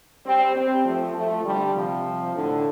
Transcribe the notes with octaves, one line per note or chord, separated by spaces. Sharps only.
G3 C4
G3 C4
F3 A3
F3 A3
D3 G3
C3 F3
A2 D3